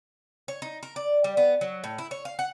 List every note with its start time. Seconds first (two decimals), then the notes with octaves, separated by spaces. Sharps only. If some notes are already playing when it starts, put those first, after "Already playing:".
0.48 C#5
0.62 D#4
0.83 A#4
0.96 D5
1.24 G3
1.37 B3
1.61 F#3
1.84 A2
1.98 E4
2.11 C#5
2.25 F5
2.39 F#5